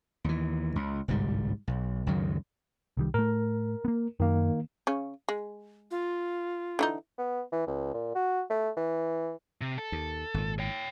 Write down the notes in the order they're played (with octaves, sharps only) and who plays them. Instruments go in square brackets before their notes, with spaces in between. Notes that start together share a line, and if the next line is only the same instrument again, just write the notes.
[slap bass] D#2 E3
C#2
G1 C2 G#2 G3
B1
C#2 F#2 D#3 F#3
[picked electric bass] C2 D#3 G3
[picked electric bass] A2 A3 [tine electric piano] A#4
[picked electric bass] A#3 B3
[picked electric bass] F#2 [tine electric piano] D#3 A#3
[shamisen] C#3 C#4
G#3
[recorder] F4
[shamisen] D3 E3 D#4
[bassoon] B3
E3
C#2
A#2
F#4
A3
E3
[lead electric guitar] C3
A4
[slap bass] D#2
G#1 A#2
[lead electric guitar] C#5 G5